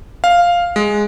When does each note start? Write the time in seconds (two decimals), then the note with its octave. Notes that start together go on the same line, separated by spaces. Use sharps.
0.24 F5
0.76 G#3